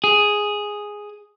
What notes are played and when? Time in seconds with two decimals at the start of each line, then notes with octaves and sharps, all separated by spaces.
0.04 G#4